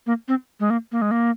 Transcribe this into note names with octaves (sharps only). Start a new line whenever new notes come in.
A#3
C4
G#3
A#3
A#3
G#3
A#3